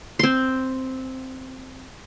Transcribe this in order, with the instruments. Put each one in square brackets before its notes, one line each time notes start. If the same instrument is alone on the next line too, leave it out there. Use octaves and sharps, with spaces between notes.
[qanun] C4 C6